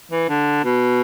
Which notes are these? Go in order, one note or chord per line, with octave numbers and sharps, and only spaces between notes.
E3
D3
B2